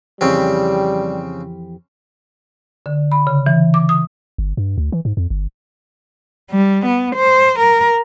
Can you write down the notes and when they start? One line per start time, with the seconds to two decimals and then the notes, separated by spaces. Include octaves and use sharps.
0.21 F2 C#3 E3 G3 C4 G4
2.86 D3
3.12 B5
3.27 C#3
3.46 E3
3.74 D6
3.89 D#6
4.38 G1
4.57 G2
4.78 D2
4.92 E3
5.05 G#2
5.17 F2
5.30 G1
6.51 G3
6.86 B3
7.16 C5
7.60 A#4